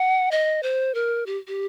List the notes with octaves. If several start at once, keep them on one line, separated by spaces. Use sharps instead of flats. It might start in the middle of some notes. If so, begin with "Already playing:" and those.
Already playing: F#5
D#5
C5
A#4
G4
G4